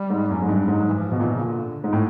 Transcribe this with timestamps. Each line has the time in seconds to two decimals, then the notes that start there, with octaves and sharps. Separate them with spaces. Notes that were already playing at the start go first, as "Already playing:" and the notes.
Already playing: G3
0.10 G#2
0.30 F#2
0.42 G#2
0.49 G2
0.68 G#2 F#3
0.88 E3
0.94 F3
1.11 B2
1.19 A#2 E3
1.34 C#3
1.45 D3
1.84 G#2
1.93 A2